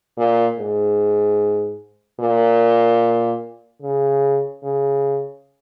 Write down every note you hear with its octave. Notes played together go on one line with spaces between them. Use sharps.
A#2
G#2
A#2
C#3
C#3